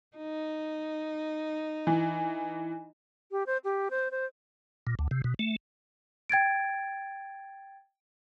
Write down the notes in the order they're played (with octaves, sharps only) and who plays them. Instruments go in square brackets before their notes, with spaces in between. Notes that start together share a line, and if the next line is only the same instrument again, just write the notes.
[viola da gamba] D#4
[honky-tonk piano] E3
[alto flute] G4
C5
G4
C5
C5
[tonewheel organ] A#2
D2
C3
B2
A3
[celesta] G5 G#6 A6 D7